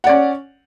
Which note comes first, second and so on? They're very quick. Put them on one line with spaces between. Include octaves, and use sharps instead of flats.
F#5 D5 C#4